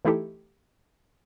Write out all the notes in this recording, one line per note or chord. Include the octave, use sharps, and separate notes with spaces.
E3 A3 D#4 E4 G4 A4